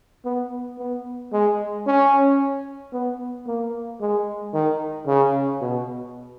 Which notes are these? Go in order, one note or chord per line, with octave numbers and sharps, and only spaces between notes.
B3
B3
G#3
C#4
B3
A#3
G#3
D#3
C#3
B2